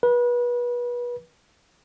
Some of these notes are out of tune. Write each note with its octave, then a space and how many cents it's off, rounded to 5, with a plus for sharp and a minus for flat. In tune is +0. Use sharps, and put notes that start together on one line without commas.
B4 -30